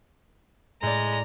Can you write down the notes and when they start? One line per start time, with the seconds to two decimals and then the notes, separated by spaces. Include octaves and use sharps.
0.82 A2 G#3 D5 A#5